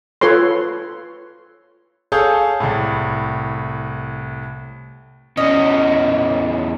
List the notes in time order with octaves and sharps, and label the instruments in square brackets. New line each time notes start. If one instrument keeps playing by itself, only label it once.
[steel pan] F4 A4 B4 C#5 C6
[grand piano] G#4 A4 C#5 F5 A5 G6
C2 A2
[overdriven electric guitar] E2 C#4 [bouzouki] D#5